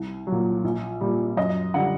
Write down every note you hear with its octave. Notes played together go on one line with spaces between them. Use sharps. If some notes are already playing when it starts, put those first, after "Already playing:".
Already playing: C2
F#3
A#2
A#1
A#2 G3
F#2 D#5
D3 G3 F#5